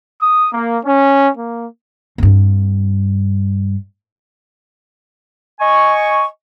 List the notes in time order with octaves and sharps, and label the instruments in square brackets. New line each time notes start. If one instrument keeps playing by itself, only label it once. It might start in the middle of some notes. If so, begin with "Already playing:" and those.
[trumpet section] D#6
A#3
C#4
A#3
[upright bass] G2 C4
[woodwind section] D#5 G#5 C#6